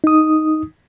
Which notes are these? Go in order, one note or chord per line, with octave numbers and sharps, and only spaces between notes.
D#4 D#6